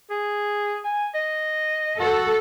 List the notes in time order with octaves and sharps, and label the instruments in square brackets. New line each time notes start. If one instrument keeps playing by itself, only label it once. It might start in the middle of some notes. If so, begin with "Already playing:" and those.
[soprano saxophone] G#4
G#5
D#5
[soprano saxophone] F#4 [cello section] A4